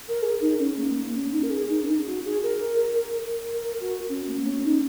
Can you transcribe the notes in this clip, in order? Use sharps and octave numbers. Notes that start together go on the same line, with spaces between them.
A#4
G#4
D#4
C#4
A#3
A#3
C#4
D#4
A#4
G#4
D#4
C#4
D#4
F#4
G#4
A#4
A#4
F#4
C#4
A#3
A#3
C#4
D#4